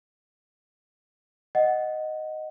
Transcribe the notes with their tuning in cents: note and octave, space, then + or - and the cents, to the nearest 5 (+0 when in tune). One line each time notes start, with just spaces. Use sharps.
D#5 +0 F#5 +0